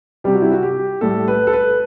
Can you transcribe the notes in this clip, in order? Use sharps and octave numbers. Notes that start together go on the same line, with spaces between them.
C3 G3 G4
F#4
E4
F#4
G4
A2 G3 A4
B4
A4
B4